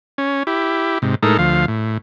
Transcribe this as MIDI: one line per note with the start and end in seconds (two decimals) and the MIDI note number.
0.18 0.43 61
0.47 0.98 64
0.47 0.98 67
1.02 1.15 44
1.02 1.15 48
1.23 1.37 45
1.23 1.37 56
1.23 1.37 63
1.23 1.37 69
1.23 1.37 70
1.39 1.66 38
1.39 1.66 53
1.39 1.66 77
1.68 1.98 45